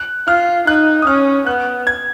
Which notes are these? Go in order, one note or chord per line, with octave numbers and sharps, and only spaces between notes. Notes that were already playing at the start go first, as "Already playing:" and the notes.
Already playing: F#6
F4 F6
D#4 F#6
D#6
C#4 F6
B3 F#6
G#6